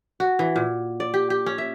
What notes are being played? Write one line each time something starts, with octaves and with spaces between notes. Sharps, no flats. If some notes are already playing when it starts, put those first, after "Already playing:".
F#4
E3
A#2
D5
G4
G4
C#4
E5